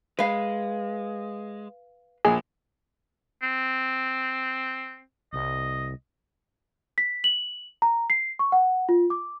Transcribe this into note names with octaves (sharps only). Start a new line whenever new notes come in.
G#3 B4 F5
A#1 G#4 G#5
C4
C2 D#5
B6
F#7
A#5
C7
C#6
F#5
F4
D6